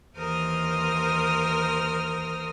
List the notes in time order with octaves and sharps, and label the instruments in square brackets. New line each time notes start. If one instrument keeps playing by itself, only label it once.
[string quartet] D#2 E3 A#4 C5 D#6 F6